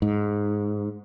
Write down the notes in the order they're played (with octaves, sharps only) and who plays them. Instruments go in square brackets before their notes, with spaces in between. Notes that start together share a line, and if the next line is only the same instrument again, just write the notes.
[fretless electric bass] G#2